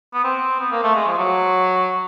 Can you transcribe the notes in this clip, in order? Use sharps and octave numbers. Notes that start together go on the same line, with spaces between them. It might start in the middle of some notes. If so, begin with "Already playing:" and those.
B3
C4
B3
A#3
A3
G#3
F3
F#3